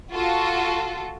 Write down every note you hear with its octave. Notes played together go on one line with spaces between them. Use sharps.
F4 F#4 A4